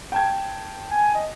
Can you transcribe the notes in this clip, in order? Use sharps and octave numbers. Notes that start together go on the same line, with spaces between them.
G5 A5 G#6
G#5
D#5